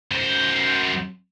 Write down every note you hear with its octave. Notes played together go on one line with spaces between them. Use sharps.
F#2 C5